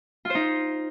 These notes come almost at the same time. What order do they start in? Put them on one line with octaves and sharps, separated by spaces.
F4 C5 D#4